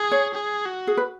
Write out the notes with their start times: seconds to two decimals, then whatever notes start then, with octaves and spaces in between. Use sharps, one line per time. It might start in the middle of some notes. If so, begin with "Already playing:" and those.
Already playing: G#4
0.11 C#5
0.34 G#4
0.65 F#4
0.87 G#4
0.97 B4